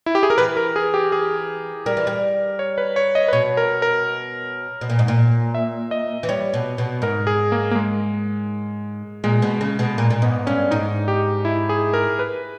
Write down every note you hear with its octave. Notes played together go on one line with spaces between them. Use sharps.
E4
G4
G#4
A#4
E3 B4
A#4
G#4
G4
G#4
G3 A#4
E3
G3
C#5
B4
C#5
D#5
B4
B2 C#5
A#4
A#4
B2
A#2
G#2
A#2
E5
D#5
E3
G3 C#5
B2
B2
G#2 A#4
G#4
A#3
A#3
G#3
A#2 G#3
B2
C#3
B2
A#2 A#3
A#2
G#2 B3
G2 C#4
G#2 D#4
G4
E4
G#4
A#4
B4